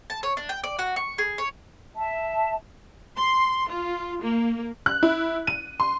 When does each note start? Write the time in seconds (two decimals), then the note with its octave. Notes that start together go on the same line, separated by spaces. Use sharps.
0.10 A5
0.23 C#5
0.37 D4
0.49 G5
0.64 D5
0.79 F#4
0.96 C#6
1.18 G#4
1.38 C#5
1.95 E5 A5
3.17 C6
3.68 F4
4.21 A#3
4.86 F#6
5.03 E4
5.47 D#7
5.80 C6